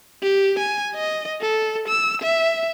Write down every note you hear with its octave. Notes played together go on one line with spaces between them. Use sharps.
G4
G#5
D#5
A4
E6
E5